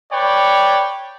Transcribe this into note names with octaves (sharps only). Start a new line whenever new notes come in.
B4 C#5 D5 G5